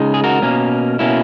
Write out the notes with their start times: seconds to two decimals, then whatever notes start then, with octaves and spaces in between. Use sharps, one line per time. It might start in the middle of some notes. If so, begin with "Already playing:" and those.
Already playing: C#3 G#3 D#4
0.14 G#4
0.24 F#4 A#4
0.42 B2 A#3 C#4
0.99 B2 A#3 C#4 E4